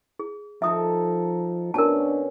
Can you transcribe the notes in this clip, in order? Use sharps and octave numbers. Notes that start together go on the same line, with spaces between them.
G#4
F3 D#4 A4 A#4 E5 D#6
B2 C#4 D4 A#4 A5